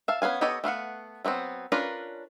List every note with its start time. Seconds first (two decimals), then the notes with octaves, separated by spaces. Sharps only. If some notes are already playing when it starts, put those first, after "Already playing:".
0.08 E5 F5 A5
0.22 B3 C#4 F5 G#5
0.41 B3 G4 A4 C#5 D#5
0.64 A3 B3 F5 F#5
1.25 F#3 A3 B3 C4
1.72 C#4 D4 F4 A#4 B4